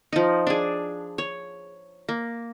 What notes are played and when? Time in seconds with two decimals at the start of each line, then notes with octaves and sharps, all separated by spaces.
0.13 F3 D#4
0.47 D4 G#4
1.18 C#5
2.09 A#3